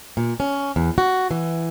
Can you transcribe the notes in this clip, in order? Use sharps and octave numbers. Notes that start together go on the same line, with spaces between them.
A#2
C#4
E2
F#4
E3